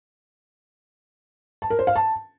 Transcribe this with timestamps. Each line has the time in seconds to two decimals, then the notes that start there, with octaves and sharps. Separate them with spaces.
1.62 A5
1.70 A#4
1.79 C5
1.87 F5
1.96 A5